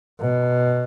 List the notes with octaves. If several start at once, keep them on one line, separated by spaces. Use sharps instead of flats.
B2